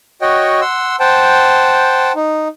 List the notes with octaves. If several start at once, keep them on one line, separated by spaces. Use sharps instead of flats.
F#4 C#5 D#5 F#5 G5
F#5 C6 E6
C5 F#5 G5 A5
D#4